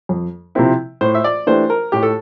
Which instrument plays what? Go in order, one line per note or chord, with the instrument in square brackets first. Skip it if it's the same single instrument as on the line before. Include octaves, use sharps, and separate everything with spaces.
[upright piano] F2
C3 F3 C4 E4
[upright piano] A2 [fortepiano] C5
[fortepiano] E5
D5
[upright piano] E3 A3 D4 G4 [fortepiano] C5
[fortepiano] A#4
[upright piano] A2 [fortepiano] G4
[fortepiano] A4